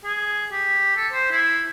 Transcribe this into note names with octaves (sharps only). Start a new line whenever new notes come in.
G#4
G4
A4
C5
E4